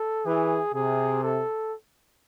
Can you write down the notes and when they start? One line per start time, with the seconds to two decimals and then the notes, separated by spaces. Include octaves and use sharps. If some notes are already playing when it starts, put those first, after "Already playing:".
Already playing: A4
0.26 E3 G#4
0.74 C3 G#4
1.23 A4